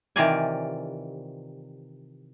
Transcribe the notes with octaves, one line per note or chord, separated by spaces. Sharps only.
C3 D#3 E3 F4 D5 G#5